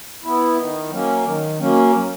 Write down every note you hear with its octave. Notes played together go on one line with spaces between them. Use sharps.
B3 E4
D#3
F#3 A#3 C#4
D#3
F#3 A#3 C#4